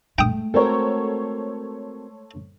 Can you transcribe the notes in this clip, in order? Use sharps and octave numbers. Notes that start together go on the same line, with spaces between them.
G#3 A3 G5 D#6
C4 F#4 A4 A#4 C5 C#5